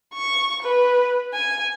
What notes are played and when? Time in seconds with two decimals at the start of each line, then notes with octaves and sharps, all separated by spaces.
0.14 C#6
0.62 B4
1.34 G#5